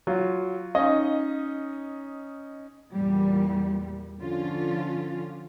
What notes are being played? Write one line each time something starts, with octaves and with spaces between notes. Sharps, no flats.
F#3 F4
C#4 D#4 D#5
E2 A#2 G3
D3 F3 C#4 F4